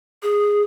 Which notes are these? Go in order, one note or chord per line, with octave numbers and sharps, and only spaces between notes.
G#4